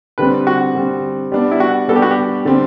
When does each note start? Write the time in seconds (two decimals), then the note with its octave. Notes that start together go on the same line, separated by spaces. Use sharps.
0.18 D3 G3 C4 B4
0.47 F#4
0.75 D3 G3 C4
1.32 G3 B3 D4
1.51 E4
1.60 F#4
1.88 G3 B3 D4 A4
1.96 G4
2.02 F#4
2.11 G4
2.45 D3 G3 C4